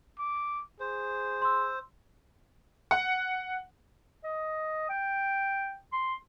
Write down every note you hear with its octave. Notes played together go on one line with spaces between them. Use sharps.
D6
G#4 C5
C6 E6
F#5
D#5
G5
C6